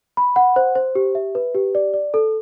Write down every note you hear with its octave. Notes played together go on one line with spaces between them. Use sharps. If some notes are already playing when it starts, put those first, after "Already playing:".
B5
F#5
C5
C5
G4
E5
B4
G4
D5
D5
A4